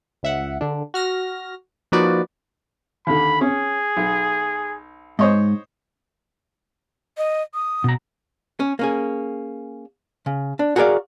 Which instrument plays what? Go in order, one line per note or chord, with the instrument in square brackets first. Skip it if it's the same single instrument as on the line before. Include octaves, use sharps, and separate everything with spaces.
[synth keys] C#2 E5 F#5
D3 D4
F#4 F6 A#6
F3 A#3 D#4 F#4 B4 D5
[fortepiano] D#2 D3 [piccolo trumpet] B5
[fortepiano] C#4 [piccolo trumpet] G#4
[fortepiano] B1
[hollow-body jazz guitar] G#2 [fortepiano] C5 C#5 D#5
[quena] D#5
D#6
[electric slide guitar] B2 A#5
[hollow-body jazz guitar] C#4
A#3 C#4 G#4
C#3
D4
F#4 G#4 A#4 C#5 D5 F5